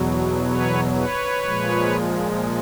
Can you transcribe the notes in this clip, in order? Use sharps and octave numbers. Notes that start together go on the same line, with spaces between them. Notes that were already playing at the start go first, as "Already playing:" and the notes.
Already playing: E2 B2 F#3
B4 C#5
B4 C#5
A#2 F3 G#3